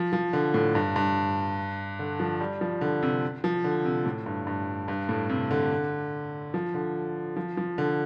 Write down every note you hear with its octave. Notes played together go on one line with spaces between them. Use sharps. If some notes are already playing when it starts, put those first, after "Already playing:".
Already playing: F3
F3
D3
A2
G2
G2
D3
F3
G3
F3
D3
C3
F3
D3
C3
A2
G2
G2
G2
A2
C3
D3
F3
D3
F3
F3
D3